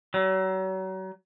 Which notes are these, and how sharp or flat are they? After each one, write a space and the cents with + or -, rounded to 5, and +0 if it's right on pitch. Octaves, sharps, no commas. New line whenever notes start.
F#3 +35